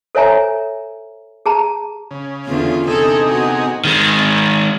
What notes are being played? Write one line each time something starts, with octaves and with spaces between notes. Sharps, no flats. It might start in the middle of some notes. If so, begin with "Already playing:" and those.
A4 C5 C#5 E5 G#5 A#5
G#4 A5 A#5
C#3
E2 D3 F4
C3 D#4 G#4 A4
B3 F#4
D#3 G#3